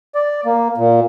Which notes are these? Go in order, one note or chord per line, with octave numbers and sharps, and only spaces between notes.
D5
A#3
A#2